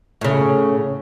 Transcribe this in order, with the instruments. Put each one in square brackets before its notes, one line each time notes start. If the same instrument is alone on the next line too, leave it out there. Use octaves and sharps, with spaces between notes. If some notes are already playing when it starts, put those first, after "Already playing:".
[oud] A2 C#3